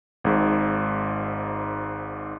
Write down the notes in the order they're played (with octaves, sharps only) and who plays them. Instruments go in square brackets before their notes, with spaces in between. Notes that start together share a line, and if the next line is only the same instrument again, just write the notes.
[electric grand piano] G#1 G#2